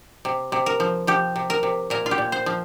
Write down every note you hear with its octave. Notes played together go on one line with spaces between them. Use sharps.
C3
C3
A#4
F3
F3 G4
C3
A#4
C3
A#2 A#4
F4
G4
A#2
C5
F3